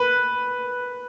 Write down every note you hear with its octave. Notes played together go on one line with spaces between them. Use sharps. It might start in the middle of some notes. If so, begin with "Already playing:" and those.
Already playing: B4